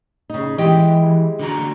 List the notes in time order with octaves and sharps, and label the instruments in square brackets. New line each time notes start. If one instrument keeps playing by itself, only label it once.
[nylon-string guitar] C#3 D#4
[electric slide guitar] E3 [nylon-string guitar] G#3 G4 D#5
[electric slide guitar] D3 F#4 A#5